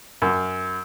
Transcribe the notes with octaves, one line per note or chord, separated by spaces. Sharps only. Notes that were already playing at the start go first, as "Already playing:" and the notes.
F#2